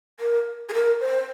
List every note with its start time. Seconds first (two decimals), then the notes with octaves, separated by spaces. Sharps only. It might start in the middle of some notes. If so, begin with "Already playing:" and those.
0.20 A#4
0.69 G#4
0.74 A#4
1.00 C5